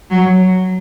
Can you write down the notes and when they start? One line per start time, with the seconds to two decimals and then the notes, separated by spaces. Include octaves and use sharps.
0.11 F#3